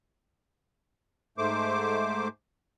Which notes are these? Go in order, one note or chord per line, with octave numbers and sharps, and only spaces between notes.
G#2 A3 C5 D6